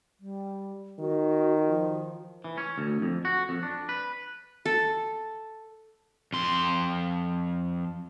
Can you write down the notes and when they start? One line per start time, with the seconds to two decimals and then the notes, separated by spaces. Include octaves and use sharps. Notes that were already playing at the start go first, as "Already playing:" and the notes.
0.20 G3
1.00 D#3 F#4
1.68 F3
2.44 E3
2.58 C#4
2.78 D2
3.02 F2
3.25 F#4
3.49 F2
3.63 D4
3.89 B4
4.66 A4
6.33 F2 C6